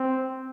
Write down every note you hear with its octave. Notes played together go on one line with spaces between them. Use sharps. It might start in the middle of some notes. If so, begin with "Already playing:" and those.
Already playing: C4